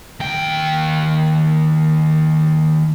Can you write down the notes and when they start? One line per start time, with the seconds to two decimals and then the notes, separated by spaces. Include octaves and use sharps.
0.20 D#2 G5